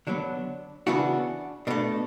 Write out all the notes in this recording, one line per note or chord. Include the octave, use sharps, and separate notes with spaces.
D3 F#3 B3 D4
C#3 E3 B3 D4 F#4
B2 A3 D4